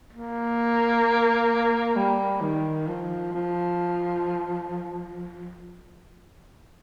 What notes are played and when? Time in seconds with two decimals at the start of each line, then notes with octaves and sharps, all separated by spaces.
0.13 A#3
1.96 G3
2.41 D#3
2.87 F3
3.33 F3